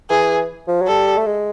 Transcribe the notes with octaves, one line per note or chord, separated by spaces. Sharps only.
E3 G#4
F3
F#3
G3 A4
A3
G#3